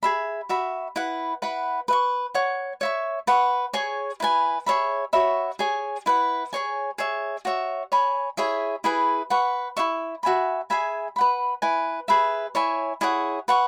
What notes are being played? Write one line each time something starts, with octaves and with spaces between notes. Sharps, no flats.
G#4 E5 B5
F#4 E5 B5
E4 B4 F#5
E4 B4 F#5 B5
B4 E5 C#6
C#5 F#5 C#6
C#5 E5 C#6
B4 F#5 C#6
G#4 C#5 G#5 C#6
E4 B4 G#5
G#4 C#5 E5 B5
F#4 C#5 E5 B5
G#4 C#5 G#5
E4 B4 F#5
G#4 C#5 G#5
G#4 C#5 E5
F#4 C#5 E5
C#5 G#5 B5
E4 G#4 C#5 E5
E4 G#4 B4 G#5
B4 F#5 C#6
E4 G#4 E5 C#6
F#4 E5 G#5 B5
G#4 E5 G#5 B5
B4 F#5 B5
E4 B4 G#5
G#4 B4 E5 B5
E4 C#5 E5 G#5
E4 G#4 C#5 F#5
B4 F#5 C#6